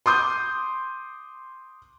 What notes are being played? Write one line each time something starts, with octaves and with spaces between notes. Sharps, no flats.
C6 D6 D#6 G6